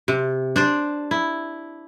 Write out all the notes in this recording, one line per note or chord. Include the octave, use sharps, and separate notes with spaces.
C3
D4 C5 D5
E4